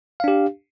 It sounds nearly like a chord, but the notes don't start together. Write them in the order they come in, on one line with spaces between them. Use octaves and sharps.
F5 D4 G4